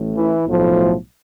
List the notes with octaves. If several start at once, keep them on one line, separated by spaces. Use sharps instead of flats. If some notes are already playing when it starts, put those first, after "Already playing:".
Already playing: A1 A2
E3 E4
B1 A2 F3